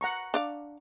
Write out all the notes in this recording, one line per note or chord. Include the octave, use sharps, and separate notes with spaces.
F#5 A#5 C#6
D4 D5 F5